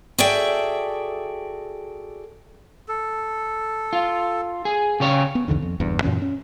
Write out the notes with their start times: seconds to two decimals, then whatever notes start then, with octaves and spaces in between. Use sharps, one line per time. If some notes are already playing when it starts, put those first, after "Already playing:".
0.18 F#4 G#4 A4 D5 E5 G5
2.88 A4
3.93 F4
4.65 G#4
5.00 C#3 G4 C#5
5.35 B3
5.48 C2 F2 D3 D#3
5.62 F2
5.80 F#1 E2 G2
6.03 F#2 A#2 E3 C#4
6.22 C#4